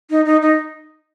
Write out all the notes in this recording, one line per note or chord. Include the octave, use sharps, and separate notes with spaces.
D#4
D#4
D#4